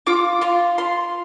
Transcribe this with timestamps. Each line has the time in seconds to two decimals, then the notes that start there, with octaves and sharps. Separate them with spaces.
0.07 F4 D6
0.41 F4 C6
0.78 F4 C6